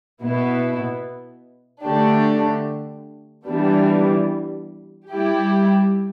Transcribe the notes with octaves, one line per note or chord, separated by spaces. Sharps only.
B2 B3 E4
D3 A3 D4 G4
E3 G3 B3 D4
G3 E4 G4